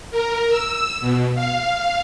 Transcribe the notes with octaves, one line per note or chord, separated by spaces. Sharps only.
A#4
E6
B2
F5